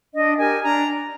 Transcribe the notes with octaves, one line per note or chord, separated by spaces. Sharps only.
D4 D#5
G4 A#4 G#5
D4 A#5